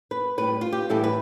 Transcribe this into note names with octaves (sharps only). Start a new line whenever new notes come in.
B4
A2 G3 B4
F4
G4
A2 E3 G3 A4
B4